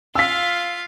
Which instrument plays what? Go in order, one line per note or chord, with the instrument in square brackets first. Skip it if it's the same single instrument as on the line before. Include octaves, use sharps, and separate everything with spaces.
[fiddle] F4 F5 [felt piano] E6 B6